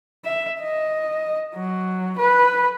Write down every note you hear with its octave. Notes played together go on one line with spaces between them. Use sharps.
E5
D#5
F#3
B4